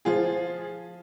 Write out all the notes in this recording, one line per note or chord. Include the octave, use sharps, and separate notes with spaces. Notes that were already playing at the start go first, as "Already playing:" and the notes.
F3 F4 G#4